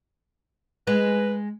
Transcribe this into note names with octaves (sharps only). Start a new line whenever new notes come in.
G#3 B4